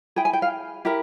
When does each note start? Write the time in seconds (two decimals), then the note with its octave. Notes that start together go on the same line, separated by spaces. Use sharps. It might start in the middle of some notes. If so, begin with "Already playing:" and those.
0.16 E4 G#4 G5
0.25 G#5
0.33 G5
0.42 F5
0.85 E4 G4 A#4